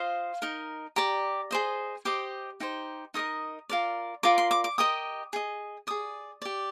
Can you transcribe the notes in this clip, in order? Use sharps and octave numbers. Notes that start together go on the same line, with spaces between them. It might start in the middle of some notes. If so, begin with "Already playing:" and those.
Already playing: F4 C5 D#5 F5
D#4 A#4 D#5
G4 D5 A#5
G#4 C5 D#5
G4 C5 D#5 D6
D#4 G4 C5
D#4 A#4 D#5 D#6
F4 A#4 D5
F4 A#4 D5 D6
C6
D6
D6
G4 A#4 D#5 D#6
G#4 D#5
G#4 D5 D#6
G4 D5